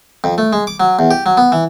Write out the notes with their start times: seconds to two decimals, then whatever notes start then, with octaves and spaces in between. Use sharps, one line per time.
0.24 F2
0.38 A3
0.53 G#3
0.67 D6
0.80 F#3
0.99 E2
1.11 G4
1.26 F#3
1.37 B3
1.52 E3